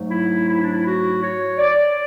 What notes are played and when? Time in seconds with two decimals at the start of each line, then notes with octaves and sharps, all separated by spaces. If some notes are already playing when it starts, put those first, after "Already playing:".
Already playing: G#2 F#3 A3
0.10 E4
0.47 E4
0.60 D4
0.72 E4
0.84 F#4
1.22 C#5
1.59 D5